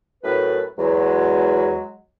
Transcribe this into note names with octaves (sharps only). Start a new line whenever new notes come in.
F#2 A2 B4
E2 F#3 G#3